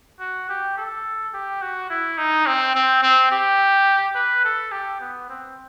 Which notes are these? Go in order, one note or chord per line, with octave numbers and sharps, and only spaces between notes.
F#4
G4
A4
G4
F#4
E4
D#4
C4
C4
C4
G4
B4
A4
G4
B3
C4